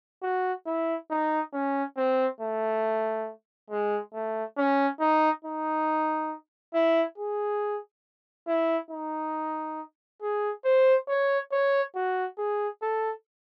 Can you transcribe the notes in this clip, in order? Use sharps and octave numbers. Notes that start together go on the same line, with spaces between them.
F#4
E4
D#4
C#4
C4
A3
G#3
A3
C#4
D#4
D#4
E4
G#4
E4
D#4
G#4
C5
C#5
C#5
F#4
G#4
A4